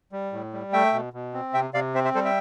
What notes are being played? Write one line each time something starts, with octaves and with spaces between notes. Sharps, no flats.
G3
A2
G3
A3 E5 G5
B2
B2
C4
C3 E5 G5
C3 D5 F5
C4 C5 E5
C5 E5
G3 A4 C5
E5 G5